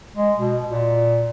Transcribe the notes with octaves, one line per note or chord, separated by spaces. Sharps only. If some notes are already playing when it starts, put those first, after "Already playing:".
G#3
B2
A#2